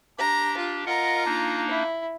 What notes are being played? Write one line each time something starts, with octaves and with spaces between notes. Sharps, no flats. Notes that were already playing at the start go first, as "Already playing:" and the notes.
D4 G4 A#5
F4
F4 A#4 D#5 F#5 A#5
A#3 D4 D#4
E4